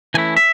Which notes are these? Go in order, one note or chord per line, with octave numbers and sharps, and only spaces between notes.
E3 A3 C#4 E4 G#5
E5